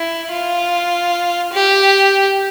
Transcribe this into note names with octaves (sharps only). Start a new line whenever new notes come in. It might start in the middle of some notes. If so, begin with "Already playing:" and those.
Already playing: E4
F4
G4